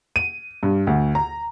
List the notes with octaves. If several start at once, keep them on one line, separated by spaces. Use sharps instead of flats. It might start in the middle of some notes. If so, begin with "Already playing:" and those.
D#7
G2
D2
A#5